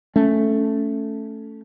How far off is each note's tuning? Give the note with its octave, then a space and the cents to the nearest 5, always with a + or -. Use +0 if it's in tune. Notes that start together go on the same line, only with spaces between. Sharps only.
A3 +0 C#4 +10